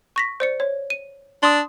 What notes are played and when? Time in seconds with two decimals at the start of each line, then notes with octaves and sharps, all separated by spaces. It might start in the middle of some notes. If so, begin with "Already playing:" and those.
0.16 C#6 A#6 B6
0.40 C5 D5 C#7
0.60 C#5
0.90 D#7
1.43 D4 C6 D#6